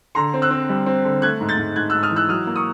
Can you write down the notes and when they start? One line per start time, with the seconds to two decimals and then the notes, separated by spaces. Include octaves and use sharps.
0.15 D3 A#5 C6
0.34 C4
0.42 E6 F#6
0.51 C4
0.69 G3
0.86 C4
1.04 D3
1.22 A3 F#6 G#6
1.40 G#2
1.49 G6 A6
1.58 G#2
1.76 G#2 F#6 G#6
1.90 G#2 E6 F#6
2.03 D#6 F6
2.11 E3
2.16 E6 F#6
2.29 F#3 D#6 F6
2.47 A#3
2.56 C#6 D#6